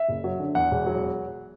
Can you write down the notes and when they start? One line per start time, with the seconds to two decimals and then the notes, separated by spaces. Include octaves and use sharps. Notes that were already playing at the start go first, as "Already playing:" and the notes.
Already playing: E5
0.08 F#1
0.24 F#3
0.40 D3
0.55 E2 F#5
0.71 E1
0.86 F#3